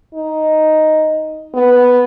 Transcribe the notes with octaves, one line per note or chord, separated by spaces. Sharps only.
D#4
B3